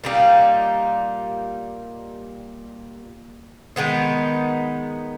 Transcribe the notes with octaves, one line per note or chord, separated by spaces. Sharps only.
A#2 G3 A#3 D#4
D#3 G#3 B3 D#4